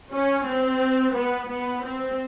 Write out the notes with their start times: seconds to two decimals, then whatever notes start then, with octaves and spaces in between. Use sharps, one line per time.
0.13 C#4
0.48 C4
1.16 B3
1.50 B3
1.85 C4